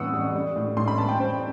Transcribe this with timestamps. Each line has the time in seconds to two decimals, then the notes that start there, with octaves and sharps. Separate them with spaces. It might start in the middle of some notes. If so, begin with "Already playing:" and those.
Already playing: A2 E3 B3 F#5 D#6 E6
0.12 G3
0.34 G3
0.56 A2
0.77 A2 C6
0.88 B5
0.98 B3 A5
1.09 G5
1.20 G3 C5